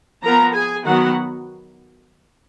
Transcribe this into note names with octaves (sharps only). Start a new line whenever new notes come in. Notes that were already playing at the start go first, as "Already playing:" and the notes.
F3 B3 A#4 A#5
G#4 G#5
D#3 F#3 B3 F#4 F#5